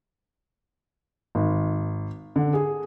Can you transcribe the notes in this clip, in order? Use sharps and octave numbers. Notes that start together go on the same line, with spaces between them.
G#1
D3
G#4